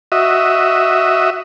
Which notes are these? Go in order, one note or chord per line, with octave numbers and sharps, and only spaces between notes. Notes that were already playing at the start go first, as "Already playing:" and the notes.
F#4 D#5 E5